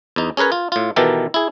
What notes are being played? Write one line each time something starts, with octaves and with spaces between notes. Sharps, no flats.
E2 D#4
C#4 G#4 A#4 B4 C#5
F4
A2 F4
B2 D#3 E3 G4 A4 A#4
E4 G#4